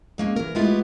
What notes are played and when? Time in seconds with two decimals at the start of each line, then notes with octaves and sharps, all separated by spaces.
0.18 G#3 A#3 C#4
0.36 E3 A#4
0.55 G#3 A3 B3 E4 F4 G4